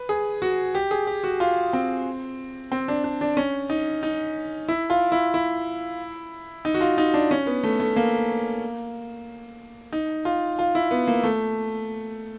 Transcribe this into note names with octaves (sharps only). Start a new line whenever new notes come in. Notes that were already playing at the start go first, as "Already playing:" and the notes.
Already playing: B4
G#4
F#4
G4
G#4
G4
F#4
F4
C4
C4
D4
D4
D4
C#4
D#4
D#4
E4
F4
E4
E4
D#4
F#4
F4
D#4
D4
C#4
B3
A3
A3
A#3
D#4
F4
F4
E4
B3
A#3
A3